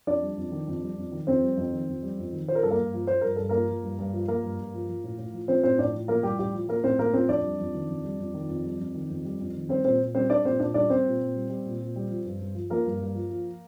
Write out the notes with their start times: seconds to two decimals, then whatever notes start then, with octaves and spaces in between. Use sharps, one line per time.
0.07 F2 D4 D5
0.22 G3
0.37 F2
0.52 D#3
0.67 F2
0.82 G3
0.97 F2
1.12 D#3
1.27 F2 C4 C5
1.43 G3
1.57 F2
1.72 D#3
1.88 F2
2.03 G3
2.18 F2
2.33 D#3
2.48 F3 C5
2.55 A#4
2.63 G2 A4
2.70 A#3 A#4
2.78 G2
2.93 F3
3.07 F3 C5
3.21 G2 A#4
3.36 G2 A4
3.49 F3 A#3 A#4
3.68 F3
3.83 G2
3.99 G2
4.13 F3
4.28 F3 A#3 A#4
4.43 G2
4.59 G2
4.74 F3
4.88 F3
5.04 A2
5.18 A2
5.33 F3
5.48 F3 C4 C5
5.64 A2 C4 C5
5.78 A2 D4 D5
5.94 F3
6.08 F3 A#3 A#4
6.23 A2 G3 G4
6.39 A2 G3 G4
6.54 F3
6.69 F3 A#3 A#4
6.84 A2 C4 C5
6.99 A2 A#3 A#4
7.13 F3 C4 C5
7.28 F2 D4 D5
7.44 G3
7.60 F2
7.74 D#3
7.89 F2
8.05 G3
8.19 F2
8.34 D#3
8.49 F2
8.65 G3
8.79 F2
8.94 D#3
9.10 F2
9.25 G3
9.40 F2
9.55 D#3
9.69 G3 C4 C5
9.84 A#2 C4 C5
10.00 A#2
10.15 G3 C4 C5
10.29 G3 D4 D5
10.44 A#2 C4 C5
10.60 A#2 D4 D5
10.74 G3 D4 D5
10.89 G3 C4 C5
11.06 A#2
11.20 A#2
11.35 G3
11.50 G3
11.66 A#2
11.80 A#2
11.96 G3
12.10 F3
12.25 G2
12.40 G2
12.55 F3
12.70 F3 A#3 A#4
12.86 G2
13.00 G2
13.15 F3
13.30 F3